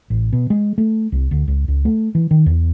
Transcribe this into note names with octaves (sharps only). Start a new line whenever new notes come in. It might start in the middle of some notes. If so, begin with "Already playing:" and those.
A1
B2
G#3
A3
C2
D2
C#2
C#2
A3
E3
D#3
E2